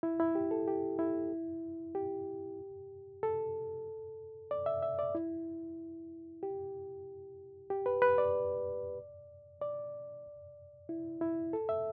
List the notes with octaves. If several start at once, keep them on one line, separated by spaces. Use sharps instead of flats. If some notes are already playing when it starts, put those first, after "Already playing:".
E4
E4
G4
A4
G4
E4
G4
A4
D5
E5
E5
D5
E4
G4
G4
B4
B4
D5
D5
E4
E4
A4
E5